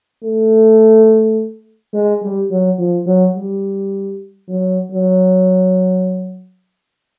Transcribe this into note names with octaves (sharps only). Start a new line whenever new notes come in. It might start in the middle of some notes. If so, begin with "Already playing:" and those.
A3
G#3
G3
F#3
F3
F#3
G3
F#3
F#3